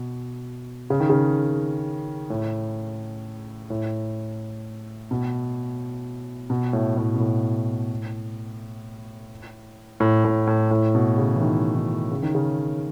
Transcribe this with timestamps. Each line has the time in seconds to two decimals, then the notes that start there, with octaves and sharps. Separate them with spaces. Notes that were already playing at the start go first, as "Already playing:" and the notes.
Already playing: B2
0.90 C#3
1.00 D#3
1.10 C#3
2.30 A2
3.70 A2
5.11 B2
6.50 B2
6.73 A2
6.97 A2
7.15 B2
7.20 A2
10.00 A2
10.25 A2
10.47 A2
10.71 A2
10.95 B2
11.18 C#3
11.36 E3
11.41 D#3
11.76 D#3
12.11 C#3
12.23 D#3
12.35 C#3